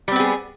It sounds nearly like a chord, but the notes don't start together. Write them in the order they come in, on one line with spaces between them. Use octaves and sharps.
G3 C4 B3 G#4